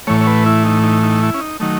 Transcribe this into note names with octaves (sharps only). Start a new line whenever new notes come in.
A2 E3 A3 C#5
C#5
B4
E4
D#4
D#4
D#4
E4
C#4
D#4
D#3 F#3 A3 D#4